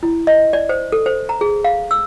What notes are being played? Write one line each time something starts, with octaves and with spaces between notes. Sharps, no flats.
E4
D#5
D5
C5
A4
C5
A#5
G#4
F5
E6